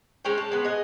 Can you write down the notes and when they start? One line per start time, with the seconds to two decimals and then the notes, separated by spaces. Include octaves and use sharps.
0.25 G#3 C#4 C#5 G5
0.38 A5
0.52 G#3 B3
0.65 D#5 G#5